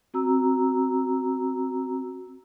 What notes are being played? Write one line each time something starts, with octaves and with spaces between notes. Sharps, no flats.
C4 F#4 A#5 E6